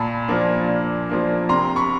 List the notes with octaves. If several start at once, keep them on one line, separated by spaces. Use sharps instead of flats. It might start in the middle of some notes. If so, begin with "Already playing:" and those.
Already playing: A#2 A5 B5
F3 A#3 D4
A#2
F3 A#3 D4
C3 A#5 C6
B5 C#6